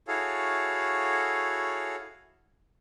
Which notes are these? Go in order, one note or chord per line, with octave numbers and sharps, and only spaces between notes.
E4 F#4 G#4 A4 C#5 F5